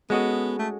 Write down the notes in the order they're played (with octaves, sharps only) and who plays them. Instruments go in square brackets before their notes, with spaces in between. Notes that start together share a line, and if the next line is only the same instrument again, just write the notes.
[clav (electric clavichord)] G#3 C#4 F#4 A4 D#5 [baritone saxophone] B3
[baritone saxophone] A3